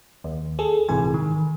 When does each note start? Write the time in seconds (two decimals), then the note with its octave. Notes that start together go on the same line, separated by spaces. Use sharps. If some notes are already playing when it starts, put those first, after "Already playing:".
0.24 D#2
0.59 G#4 A4
0.89 A#1 G#2 C3 E3 G#5
1.14 D#3